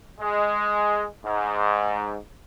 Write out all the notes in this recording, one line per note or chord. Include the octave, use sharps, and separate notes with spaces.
G#3
G#2